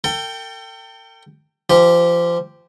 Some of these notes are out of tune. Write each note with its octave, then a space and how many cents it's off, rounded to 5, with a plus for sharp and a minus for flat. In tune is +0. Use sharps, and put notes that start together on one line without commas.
A4 +40 G5 +0
F3 -25 G4 +0